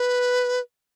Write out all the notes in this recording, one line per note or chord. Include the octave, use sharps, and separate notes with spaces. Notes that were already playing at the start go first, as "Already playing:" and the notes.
Already playing: B4